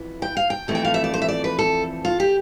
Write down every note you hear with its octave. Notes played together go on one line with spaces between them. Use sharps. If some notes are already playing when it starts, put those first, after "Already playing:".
Already playing: F2 E3 B3 E4
G5
F5
G5
F2 E3 A3 C4
G5
F5
E5
D5
C5
E5
D5
B4
A4
F4
G4